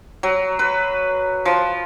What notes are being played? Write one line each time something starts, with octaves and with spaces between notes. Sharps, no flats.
F#3
B4
F3